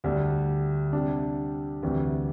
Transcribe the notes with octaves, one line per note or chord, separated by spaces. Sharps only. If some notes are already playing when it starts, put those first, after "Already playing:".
D2 D3 G3 D4
C3 G3 D4
D2 C3 E3 G3